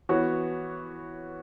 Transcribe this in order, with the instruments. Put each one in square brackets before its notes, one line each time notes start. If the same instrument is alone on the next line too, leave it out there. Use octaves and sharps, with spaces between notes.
[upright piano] E3 B3 F#4 C#5